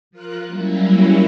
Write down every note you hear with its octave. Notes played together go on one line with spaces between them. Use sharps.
F3 F4 A#4 F#6
F#3 G3 A#3 C#4 E4